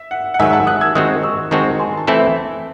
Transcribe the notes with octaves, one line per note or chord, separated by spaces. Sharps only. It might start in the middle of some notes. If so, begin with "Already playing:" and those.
Already playing: E5
F#5
F#5
G#2 D#3 F#3 E5 G#5
F#5 A5
D#6 F#6
E6 G#6
D#3 G#3 C4 F#4 D#6 F#6
C#6 E6
D#3 G#3 C4 F#4 A5 C#6
G#5 C6
A5
E3 A3 C4 E4 A4 E5 G#5